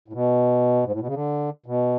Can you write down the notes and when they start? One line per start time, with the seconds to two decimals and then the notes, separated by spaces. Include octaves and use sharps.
0.08 A2
0.13 B2
0.85 G#2
0.92 A2
1.00 B2
1.07 C#3
1.14 D3
1.66 B2